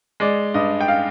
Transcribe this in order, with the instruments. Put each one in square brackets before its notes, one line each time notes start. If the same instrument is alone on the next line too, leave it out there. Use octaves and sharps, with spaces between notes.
[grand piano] G#3 D5
G2 D#5
G5
F5